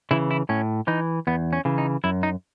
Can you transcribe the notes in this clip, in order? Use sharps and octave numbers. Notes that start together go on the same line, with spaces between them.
C#3 E3 E4
E4
A2 C#4
E3 D#4
E2 B3
C#4
C#3 E3
D#4
F#2 E4
D#4